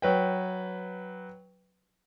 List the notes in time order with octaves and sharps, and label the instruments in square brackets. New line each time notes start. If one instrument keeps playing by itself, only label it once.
[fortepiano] F#3 B4 G5